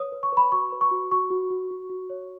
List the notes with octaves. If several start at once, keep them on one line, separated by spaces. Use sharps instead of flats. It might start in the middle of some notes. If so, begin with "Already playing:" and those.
Already playing: B4 C#5 D#6
B4
C#6
B4 B5
F#4 C#6
B4
C#6
F#4
F#4 C#6
F#4
F#4
F#4
F#4
C#5